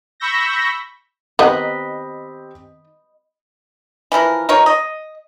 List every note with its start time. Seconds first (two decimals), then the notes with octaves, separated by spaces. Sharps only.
0.20 B5 C#6 E6 G6 A#6
1.39 D#3 B3 C4 G4 D#5 B5 F#6
4.12 E3 F3 E4 A#4
4.49 D#4 F4 A#4 C#5
4.66 D#5